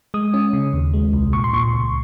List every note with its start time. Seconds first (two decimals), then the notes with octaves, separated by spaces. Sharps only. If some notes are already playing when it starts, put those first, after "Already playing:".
0.14 G#3 D#6
0.34 C#4
0.53 C#3
0.73 D#2
0.94 G#3
1.13 C2
1.33 A#2 C#6
1.44 C6
1.53 A#2 C#6
1.74 C#2